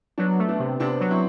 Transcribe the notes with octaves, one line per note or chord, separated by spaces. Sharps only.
F#3 B3 D4
A3
B3 D4
C3
C3 B3 D4
F#3
C4 E4